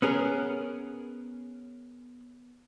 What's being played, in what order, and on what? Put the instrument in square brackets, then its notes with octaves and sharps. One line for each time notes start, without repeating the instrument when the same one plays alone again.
[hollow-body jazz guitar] B3 C#4 G#4 A#4